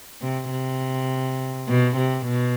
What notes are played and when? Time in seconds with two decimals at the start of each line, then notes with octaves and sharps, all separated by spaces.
0.22 C3
0.51 C3
1.68 B2
1.97 C3
2.26 B2